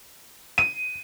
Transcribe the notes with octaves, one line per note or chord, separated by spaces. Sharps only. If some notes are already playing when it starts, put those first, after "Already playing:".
D#7